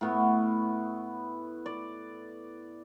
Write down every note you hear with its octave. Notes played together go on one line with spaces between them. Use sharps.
A2 B3 F#4
D5